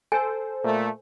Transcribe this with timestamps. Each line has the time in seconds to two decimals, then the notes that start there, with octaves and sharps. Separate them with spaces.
0.12 A4 C5 G#5
0.64 A#2 A3